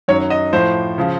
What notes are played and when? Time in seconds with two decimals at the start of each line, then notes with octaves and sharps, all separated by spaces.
0.08 F#2 D#3 F#3 C#5
0.30 D#5
0.53 A2 F3 C5
0.98 C#3 F3